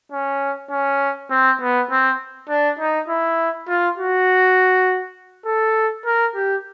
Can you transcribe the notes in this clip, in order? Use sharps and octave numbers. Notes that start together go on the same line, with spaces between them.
C#4
C#4
C4
B3
C4
D4
D#4
E4
F4
F#4
A4
A#4
G4